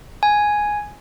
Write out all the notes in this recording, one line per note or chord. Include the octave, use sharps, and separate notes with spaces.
G#5